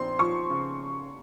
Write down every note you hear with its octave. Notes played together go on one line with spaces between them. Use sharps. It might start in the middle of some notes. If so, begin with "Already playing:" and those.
Already playing: A#1 C4 C6
F3 C#6
C#3